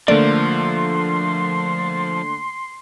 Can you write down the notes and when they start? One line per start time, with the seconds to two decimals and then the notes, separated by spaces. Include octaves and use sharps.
0.08 D3 F3 A3 A#3 D5 C6